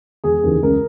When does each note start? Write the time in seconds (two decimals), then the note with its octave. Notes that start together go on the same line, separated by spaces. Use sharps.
0.24 E1 G#4
0.43 D#2 C#3 E3
0.62 C#2 A#4